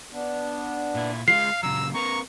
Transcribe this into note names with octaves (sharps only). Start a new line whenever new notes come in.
B3 D4
A#2 E4
G#3 F4 F5 C7
A#2 C#3 F#3 A#5 E6
C4 A#4 B4 A#5 C#6